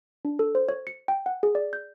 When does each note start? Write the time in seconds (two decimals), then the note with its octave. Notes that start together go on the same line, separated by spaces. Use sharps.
0.25 D4
0.39 A4
0.55 C5
0.69 C#5
0.87 C#7
1.08 G5
1.26 F#5
1.43 G#4
1.55 D5
1.73 G6